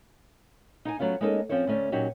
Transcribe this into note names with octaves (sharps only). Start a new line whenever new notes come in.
D#4 G5 G#5
F#3 A3 B3 C#4 F4
G#3 A#3 C#4 D#4 G#4 A4
F3 C4 C#4 C5 C#5
D2 A3 C#4 C5 D5
A#2 F#3 C#4 D#4 F#4 G4